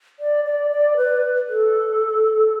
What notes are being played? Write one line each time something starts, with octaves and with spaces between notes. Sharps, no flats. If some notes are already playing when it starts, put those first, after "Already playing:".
D5
D5
D5
B4
A4